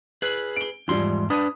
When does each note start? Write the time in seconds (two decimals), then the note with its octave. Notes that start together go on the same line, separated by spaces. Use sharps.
0.22 G#4 B4
0.56 D7 G7
0.88 E2 G#2 F3 G3 C6
1.30 D4 B4 D#6